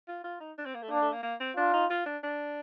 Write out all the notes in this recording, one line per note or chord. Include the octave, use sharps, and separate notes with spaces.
F4
F4
D#4
D4
C4
A#3
A3
A#3 D4
A3
A#3
A#3
C4
D4 F4
D#4
F4
D4
D4